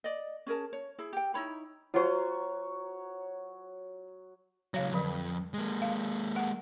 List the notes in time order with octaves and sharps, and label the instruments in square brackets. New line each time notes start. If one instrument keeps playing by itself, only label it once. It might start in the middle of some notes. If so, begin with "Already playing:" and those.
[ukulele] D5 D#5
C#4 G#4 A#4 A5
C#5
E4 G#4
G4 G5
D#4 E4 C#5 B5
[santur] F#3 C#5 [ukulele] F4 C5
[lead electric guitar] C#2 F#3 [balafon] C#5 F5
[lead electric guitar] F2 [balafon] D3 F#3
[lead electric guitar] G#3 A#3
[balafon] F5
F#5